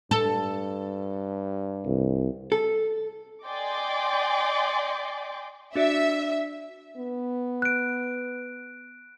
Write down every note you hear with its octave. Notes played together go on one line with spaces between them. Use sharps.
G2 A4
C2
A4
D5 D#5 G5 G#5 C6 D6
D4 F#4 D5 E5
B3
F#6 D7